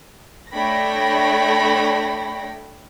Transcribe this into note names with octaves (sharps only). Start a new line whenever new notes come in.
A3 D4 C#5 G5 B5 A#6